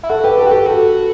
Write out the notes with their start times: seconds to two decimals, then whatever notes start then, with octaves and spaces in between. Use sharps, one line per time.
0.03 E4
0.09 F#4 A4
0.24 G4 B4
0.38 G4 A4
0.47 F#4
0.51 G4 A4
0.66 F#4 A4